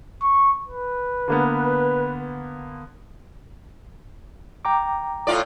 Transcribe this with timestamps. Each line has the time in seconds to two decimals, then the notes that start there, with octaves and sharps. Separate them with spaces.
0.22 C#6
0.68 B4
1.28 D3 A#3 B3
4.65 G5 A#5 D6
5.27 A2 F4 D5